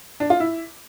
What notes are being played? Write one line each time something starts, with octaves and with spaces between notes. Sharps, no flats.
D4
F4
E4